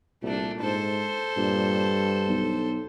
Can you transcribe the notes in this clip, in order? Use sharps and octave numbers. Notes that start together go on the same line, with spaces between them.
C2 A#2 A3 D4
G#2 A4 C5
G2 A#2
B1